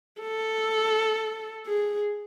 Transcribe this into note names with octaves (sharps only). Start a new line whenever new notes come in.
A4
G#4